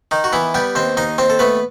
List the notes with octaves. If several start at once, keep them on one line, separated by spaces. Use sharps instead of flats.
D#3 D#4
F#4
E3 B3 E4
G3 B3 G4
D#2 C4 C5
D#2 D#4 D#5
D#2 C4 C5
A4
A3 B3 B4